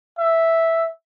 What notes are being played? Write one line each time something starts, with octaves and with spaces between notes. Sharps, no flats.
E5